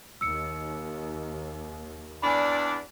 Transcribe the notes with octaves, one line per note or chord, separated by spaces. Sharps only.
D#2 E6 C#7
E2 D4 D5 G#5 B5